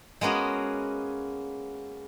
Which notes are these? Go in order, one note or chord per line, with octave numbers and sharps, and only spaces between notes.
G#3 A#3 B3 C#4 F#4